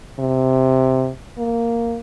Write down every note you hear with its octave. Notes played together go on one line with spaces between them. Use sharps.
C3
A#3